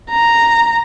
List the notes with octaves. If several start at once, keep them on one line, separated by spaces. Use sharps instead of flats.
A#5